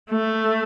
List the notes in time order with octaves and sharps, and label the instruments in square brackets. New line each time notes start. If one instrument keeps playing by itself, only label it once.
[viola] A3